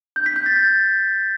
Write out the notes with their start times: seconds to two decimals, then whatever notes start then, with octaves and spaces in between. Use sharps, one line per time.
0.16 G6
0.26 B6
0.36 G6
0.46 A6